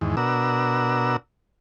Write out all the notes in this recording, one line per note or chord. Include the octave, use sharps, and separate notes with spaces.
E2 G#2 D#3
B2 D4 F#4 A#4 E6